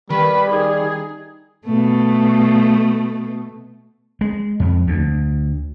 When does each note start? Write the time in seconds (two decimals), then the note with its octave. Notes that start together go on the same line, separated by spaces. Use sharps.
0.10 D#3 G3 B4
0.50 D#4 G#4
1.65 B2 A3
4.21 G#3
4.60 F2
4.87 D2